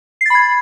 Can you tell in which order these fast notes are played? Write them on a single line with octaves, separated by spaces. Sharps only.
C7 A6 B5 G#6